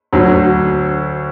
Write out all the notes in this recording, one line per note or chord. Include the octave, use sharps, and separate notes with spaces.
D2 D3 F#3